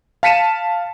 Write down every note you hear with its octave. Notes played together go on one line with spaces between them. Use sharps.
F5 A5 B6 C#7 D#7 E7